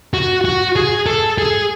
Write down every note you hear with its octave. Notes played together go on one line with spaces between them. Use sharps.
F#4
F#4
G#4
A4
G#4